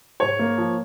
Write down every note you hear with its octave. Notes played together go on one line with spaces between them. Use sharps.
G#2 C#5
A#3
F3